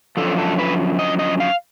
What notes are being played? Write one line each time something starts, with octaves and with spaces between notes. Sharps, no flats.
F#2 D3 F3 A4
A4
B4
D#5
D#5
F5